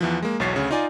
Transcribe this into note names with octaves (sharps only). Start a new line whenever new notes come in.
E2 E3 F3
G#3 A#3
B1 E2 F#3 C#5 A6 C7
D2 C#3 C#5
D#4 F4 D5 G#5